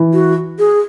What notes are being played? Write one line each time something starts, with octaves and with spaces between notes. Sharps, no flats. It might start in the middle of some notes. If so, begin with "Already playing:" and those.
Already playing: E3
F#4
G#4